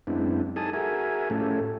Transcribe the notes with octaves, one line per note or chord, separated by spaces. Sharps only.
F#2 G#3 B3 C4 D4 E4
D#4 G4 A4 G#5 A5 D#6
F#4 G#4 A#4 E5 G#5
A2 F3 A3 C#4 G4 A4